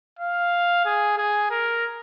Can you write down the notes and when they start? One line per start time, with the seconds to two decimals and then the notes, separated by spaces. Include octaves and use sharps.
0.19 F5
0.85 G#4
1.18 G#4
1.51 A#4